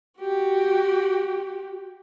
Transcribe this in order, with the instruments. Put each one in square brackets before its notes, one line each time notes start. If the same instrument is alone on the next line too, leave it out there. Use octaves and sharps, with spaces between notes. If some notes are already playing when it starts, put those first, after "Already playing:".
[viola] F#4 G4